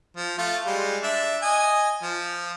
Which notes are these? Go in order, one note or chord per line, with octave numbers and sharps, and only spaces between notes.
F3
A3 F4
G3 G#3
D4 E5
D#5 G#5
F3